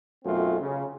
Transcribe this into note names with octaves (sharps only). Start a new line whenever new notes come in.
B1 F#2 A3 C4 F4
C#3